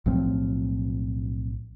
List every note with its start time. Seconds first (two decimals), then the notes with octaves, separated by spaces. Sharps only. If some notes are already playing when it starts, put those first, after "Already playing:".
0.06 B1 A2 F3 C4